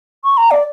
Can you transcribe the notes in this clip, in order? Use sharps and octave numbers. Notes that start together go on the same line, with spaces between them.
C#6
A#5
D5